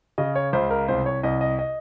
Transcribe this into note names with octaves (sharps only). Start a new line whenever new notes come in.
C#3 D#5
C#5
C#2 C5
A#4
C2 C5
C#5
C2 D#5
D#5
D#5